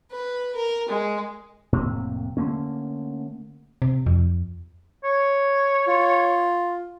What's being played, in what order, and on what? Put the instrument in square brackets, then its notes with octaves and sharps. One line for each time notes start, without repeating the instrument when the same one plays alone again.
[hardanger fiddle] B4
A#4
G#3
[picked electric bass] F1 A2 C3 A#3
D3 A3 A#3 C#4
[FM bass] C3
F2
[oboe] C#5
[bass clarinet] F4